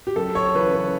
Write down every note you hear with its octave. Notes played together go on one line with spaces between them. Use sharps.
G4
F#2 A4
C#5
C#3 E3 B4
B4